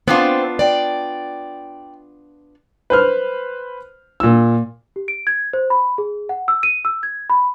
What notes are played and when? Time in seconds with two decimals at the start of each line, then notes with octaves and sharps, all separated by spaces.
0.08 B3 C4 D4 F4
0.59 D5 G5
2.90 B4 C5 F6
4.20 A#2 E6
4.96 G4
5.08 D7
5.27 G#6
5.53 C5
5.70 B5
5.98 G#4
6.29 F#5
6.48 E6
6.63 D#7
6.85 E6
7.03 G#6
7.30 B5